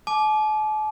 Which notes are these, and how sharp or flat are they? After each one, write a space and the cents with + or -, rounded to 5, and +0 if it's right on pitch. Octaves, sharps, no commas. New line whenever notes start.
A5 -45 D6 +0